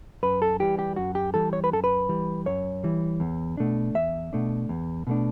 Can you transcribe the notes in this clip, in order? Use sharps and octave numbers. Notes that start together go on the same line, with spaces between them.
F#2 B4
A4
E3 G3 G4
G4
F#2 F#4
G4
E3 G3 A4
C#5
B4
F#2 A4
B4
E3 G3
F#2 C#5
E3 G3
E2
B2 A3 D4
E2 E5
B2 A3 D4
E2
B2 A3 D4